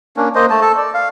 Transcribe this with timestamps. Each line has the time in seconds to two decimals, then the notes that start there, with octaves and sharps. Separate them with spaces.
0.17 A#3 C#4 D4
0.35 A#3 C5 D#5
0.50 A3 A5
0.61 A4 A5
0.77 D5
0.94 F5